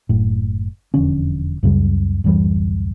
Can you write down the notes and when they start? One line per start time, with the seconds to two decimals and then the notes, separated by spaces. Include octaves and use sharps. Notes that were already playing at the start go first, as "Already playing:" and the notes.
0.09 F#1 A2
0.94 E1 F2 D3 C#4
1.63 C#2 F#2 C#3 G3
2.24 D1 F#2 E3 G3